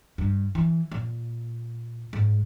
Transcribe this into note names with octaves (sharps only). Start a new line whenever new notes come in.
G2
E3
A#2
G#2